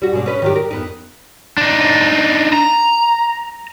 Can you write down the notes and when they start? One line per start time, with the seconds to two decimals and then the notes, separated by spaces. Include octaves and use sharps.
0.02 G3 F#4
0.13 B2 G#3 D4
0.26 C#4 B4
0.42 D#3 F#3 G4
0.56 A#4
0.71 F2 B3 D#4
1.58 D4 D#4
2.53 A#5